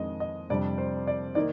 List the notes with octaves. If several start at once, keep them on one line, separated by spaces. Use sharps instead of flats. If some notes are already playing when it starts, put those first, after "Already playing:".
Already playing: F2 D#3 G#3 D4 D#5
D#5
F2 C3 G3 D4 D5
C5
D5
D#3 A#3 D#4 D5